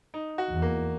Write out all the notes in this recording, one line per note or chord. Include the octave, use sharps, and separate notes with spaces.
D#4
F#4
E2
A#3